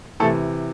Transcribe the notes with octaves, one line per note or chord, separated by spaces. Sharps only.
C3 E3 A3 A4